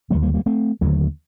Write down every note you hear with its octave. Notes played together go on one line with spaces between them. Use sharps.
D#2 D3 F#3 A3
G3 A#3
G3 A#3
A3 C4
D#2 D3 F#3 A3